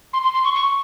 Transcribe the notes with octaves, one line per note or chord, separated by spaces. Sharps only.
C6
C6
C6
C#6
C#6